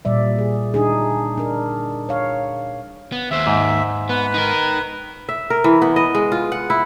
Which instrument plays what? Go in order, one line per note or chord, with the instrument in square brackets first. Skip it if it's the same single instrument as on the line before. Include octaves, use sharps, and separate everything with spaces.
[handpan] A#2 G3 D5 E5
G#4
D4 D#4 G#4
D4 A#4
C#5 F5
[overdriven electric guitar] B3
[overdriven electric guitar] D#2 C5 [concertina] E5
[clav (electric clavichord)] G#2
[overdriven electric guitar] B3 [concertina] B4
[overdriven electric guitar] D#4 A#4
[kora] E5
A#4
E3
B3
D#5
G#3
F4
F#5
E4